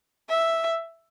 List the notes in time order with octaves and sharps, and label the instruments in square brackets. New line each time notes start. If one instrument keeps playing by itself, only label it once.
[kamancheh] E5